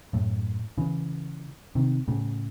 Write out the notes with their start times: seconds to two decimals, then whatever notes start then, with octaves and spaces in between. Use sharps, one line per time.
0.13 F#2 A2
0.78 C#3 E3
1.75 C3 D#3
2.08 A2 C#3